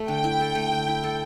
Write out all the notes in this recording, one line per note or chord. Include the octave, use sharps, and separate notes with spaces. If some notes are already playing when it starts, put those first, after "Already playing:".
Already playing: A3 A4
D3 G5
E4
A4
A3
D3
E4
A4